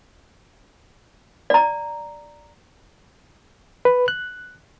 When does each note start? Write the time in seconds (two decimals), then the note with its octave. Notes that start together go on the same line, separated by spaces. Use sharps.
1.50 D5 A#5
3.85 B4
4.08 F#6